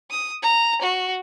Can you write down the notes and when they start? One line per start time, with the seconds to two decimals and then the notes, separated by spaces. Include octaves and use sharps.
0.11 D#6
0.42 A#5
0.82 F#4